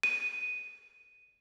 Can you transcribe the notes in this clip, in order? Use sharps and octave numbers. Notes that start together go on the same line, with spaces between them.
D#7